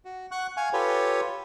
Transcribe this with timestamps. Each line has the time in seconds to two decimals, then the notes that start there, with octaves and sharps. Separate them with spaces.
0.05 F#4
0.31 F#5 C#6 F#6
0.57 F5 G#5 C#6
0.73 F4 G4 A4 B4 C#5